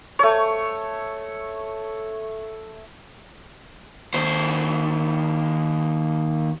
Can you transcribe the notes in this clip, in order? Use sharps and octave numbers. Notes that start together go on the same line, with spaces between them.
A3 C#5
D#2 C5